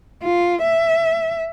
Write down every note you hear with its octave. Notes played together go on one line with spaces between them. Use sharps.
F4
E5